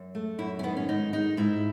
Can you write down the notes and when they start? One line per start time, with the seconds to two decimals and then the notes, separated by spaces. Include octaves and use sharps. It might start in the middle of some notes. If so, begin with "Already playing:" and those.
Already playing: F#2
0.15 A3
0.39 F#2 E4
0.59 C#4
0.63 D#3 B3
0.77 C#4
0.89 G#2 D#4
1.13 G#3 D#4
1.37 G#2 E4